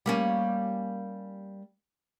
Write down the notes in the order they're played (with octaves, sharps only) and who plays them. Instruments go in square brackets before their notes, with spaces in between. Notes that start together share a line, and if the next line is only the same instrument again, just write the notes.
[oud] G3 A#3 C#4